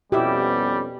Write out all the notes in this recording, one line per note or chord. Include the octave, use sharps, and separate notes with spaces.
F2 B2 G3 B3 C#4 E4 G4 E5